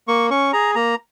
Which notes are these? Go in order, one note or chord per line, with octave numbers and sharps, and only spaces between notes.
A#3 C#6
C#4 C#6
G#4 A#5
A#3 A#5